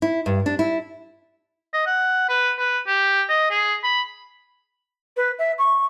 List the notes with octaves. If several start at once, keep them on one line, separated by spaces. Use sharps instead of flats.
E4
G2
D4
E4
D#5
F#5
B4
B4
G4
D#5
G#4
B5
B4
E5
C#6